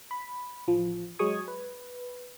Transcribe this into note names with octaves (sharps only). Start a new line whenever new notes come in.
B5
A1 F3
F#3 G#3 G#4 C#6 D#6 G#6
B4